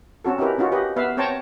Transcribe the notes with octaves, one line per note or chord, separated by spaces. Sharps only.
C4 C#4 F#4 A4
C#4 D#4 E4 G4 A#4 B4
C#4 D#4 F4 F#4
G4 B4 D#5
B3 B4 E5 F5
C4 C5 C#5 G5 A5 A#5